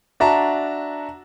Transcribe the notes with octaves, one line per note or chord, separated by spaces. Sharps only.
D4 F#4 E5 A5 A#5